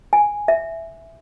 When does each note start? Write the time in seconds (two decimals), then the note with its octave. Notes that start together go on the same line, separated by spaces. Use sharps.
0.13 G#5
0.48 E5